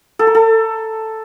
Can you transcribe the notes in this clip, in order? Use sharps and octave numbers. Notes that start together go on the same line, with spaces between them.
A4
A#4
A4